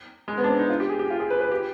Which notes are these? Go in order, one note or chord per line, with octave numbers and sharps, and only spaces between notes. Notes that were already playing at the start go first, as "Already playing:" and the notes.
G#3
B3
D4
C4
D#4
F4
G4
G#4
G4
F4
G#4
B4
B4
G4